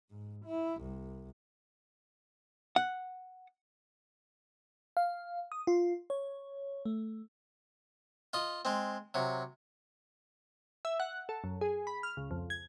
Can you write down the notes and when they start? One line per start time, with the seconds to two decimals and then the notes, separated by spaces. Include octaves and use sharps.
0.10 G#2
0.46 E4
0.81 C2
2.76 F#5
4.97 F5
5.52 D#6
5.67 F4
6.10 C#5
6.85 A3
8.33 F4 D#5
8.65 G#3 C4
9.14 C3 F#3
10.85 E5
11.00 F#5
11.29 A4
11.44 F#2
11.61 G#4
11.87 B5
12.03 F6
12.17 C#2
12.31 F2
12.50 G#6